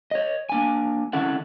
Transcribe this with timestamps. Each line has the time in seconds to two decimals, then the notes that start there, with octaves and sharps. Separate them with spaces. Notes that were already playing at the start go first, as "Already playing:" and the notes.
0.11 C#5 D#5
0.49 A#3 D4 G#5
1.13 C3 D#3 C#4 E4 A4 F#5